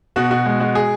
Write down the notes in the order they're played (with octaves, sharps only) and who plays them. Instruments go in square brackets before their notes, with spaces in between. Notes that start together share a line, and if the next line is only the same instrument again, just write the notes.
[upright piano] B2 F#4
B2 F#4
G#3
G#3 F#4
G#4